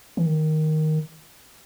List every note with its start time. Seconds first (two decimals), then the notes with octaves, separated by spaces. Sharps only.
0.17 E3
0.26 D#3